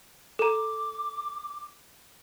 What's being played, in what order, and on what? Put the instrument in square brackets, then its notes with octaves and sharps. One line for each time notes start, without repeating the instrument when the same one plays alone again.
[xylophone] A4 A#5 [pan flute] D6